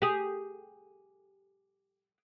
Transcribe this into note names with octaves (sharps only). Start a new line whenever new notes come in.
G4 G#4